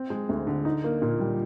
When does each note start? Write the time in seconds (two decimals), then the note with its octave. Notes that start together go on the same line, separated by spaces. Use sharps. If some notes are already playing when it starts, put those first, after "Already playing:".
Already playing: C4
0.10 G#3
0.29 D2
0.47 D3
0.65 D#4
0.84 A#3
1.02 A#2
1.20 G3